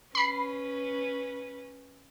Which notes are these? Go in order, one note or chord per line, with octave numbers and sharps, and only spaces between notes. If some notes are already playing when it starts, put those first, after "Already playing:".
C#4 B4 B5 C7